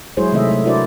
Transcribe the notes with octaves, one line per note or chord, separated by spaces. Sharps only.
F#3 G#3 E4 G#4 C5 C#5
C3 D#3 A3 D#5 E5
A3
D4 E4 F#4 A#4 C5 D5